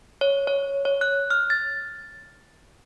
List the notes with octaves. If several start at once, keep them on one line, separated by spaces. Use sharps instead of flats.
C#5
C#5
C#5
F#6
F6
A6